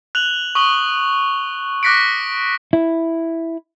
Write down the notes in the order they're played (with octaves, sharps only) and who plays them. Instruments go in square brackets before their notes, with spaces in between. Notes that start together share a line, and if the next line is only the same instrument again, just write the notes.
[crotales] F#6 F7 F#7
C#6 D#6 F#7 G7
D6 F#6 A#6 B6 C#7 D7
[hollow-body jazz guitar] E4